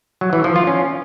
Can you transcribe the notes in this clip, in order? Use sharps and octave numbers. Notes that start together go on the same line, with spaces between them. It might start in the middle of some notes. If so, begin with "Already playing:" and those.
F#3
E3
F3
F4
C#4